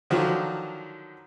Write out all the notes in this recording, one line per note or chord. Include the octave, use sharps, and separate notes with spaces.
D3 D#3 F3 F#3